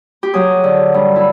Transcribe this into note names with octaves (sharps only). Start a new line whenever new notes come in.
G4
F#3 G#4
D3
G2
E4